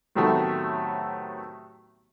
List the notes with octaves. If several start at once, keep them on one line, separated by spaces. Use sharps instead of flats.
A2 C3 D#3 F#3 A3 B3